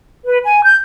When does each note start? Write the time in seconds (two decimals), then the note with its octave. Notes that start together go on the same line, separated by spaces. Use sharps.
0.25 B4
0.44 G#5
0.64 G6